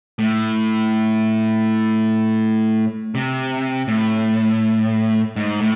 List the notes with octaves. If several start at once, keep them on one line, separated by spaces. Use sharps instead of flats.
A2
C3
A2
G#2
A2